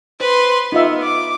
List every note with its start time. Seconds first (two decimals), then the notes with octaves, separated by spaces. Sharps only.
0.20 B4 C5 C6
0.72 B3 D#4 F4 E5
1.03 D6